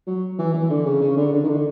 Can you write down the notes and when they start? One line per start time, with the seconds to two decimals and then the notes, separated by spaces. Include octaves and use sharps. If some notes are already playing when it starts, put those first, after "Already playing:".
0.07 F#3
0.39 E3
0.53 E3
0.70 D3
0.85 C#3
1.01 C#3
1.17 D3
1.33 D3
1.43 D#3
1.49 D3